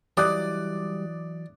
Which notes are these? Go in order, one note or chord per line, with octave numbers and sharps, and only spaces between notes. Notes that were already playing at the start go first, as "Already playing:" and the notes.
E3 F#3 G3 D#4 D5 D6 D#6 F#6